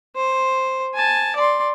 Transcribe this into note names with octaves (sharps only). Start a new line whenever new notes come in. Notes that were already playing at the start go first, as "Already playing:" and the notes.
C5
G#5 A5
D5 C6